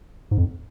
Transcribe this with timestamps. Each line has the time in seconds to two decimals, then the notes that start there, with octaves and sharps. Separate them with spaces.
0.31 G#2
0.38 F2